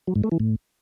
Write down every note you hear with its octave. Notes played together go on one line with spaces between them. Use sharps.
F#3
G#2
A3
E3
A2